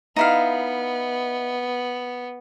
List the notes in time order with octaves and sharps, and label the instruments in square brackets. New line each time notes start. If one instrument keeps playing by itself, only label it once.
[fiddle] B3 [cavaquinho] D#4 E4 F5